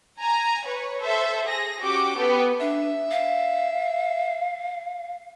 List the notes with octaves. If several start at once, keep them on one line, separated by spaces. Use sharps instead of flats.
G#5 A#5
B4 C#5
A4 C5 E5
G#4 A#6
C#4 F#4 G4 D6
B3 G4 A4
D4 E5
F5